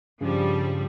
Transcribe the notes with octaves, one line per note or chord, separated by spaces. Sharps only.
G2 C#3 F3 G3